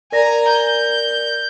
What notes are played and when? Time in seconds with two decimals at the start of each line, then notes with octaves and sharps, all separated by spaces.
0.12 A#4 D5 G#5 A#5 A#6
0.49 G6